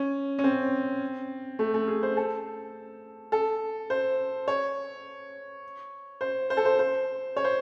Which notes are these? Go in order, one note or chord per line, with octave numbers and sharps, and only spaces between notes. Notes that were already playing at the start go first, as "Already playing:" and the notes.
Already playing: C#4
C#4
C4
A3
A3
G#4
C5
A4
A4
C5
C#5
C5
C5
A4
C5
C5
C#5
C5